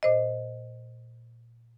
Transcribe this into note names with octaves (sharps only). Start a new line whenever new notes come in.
A#2 C5 D#5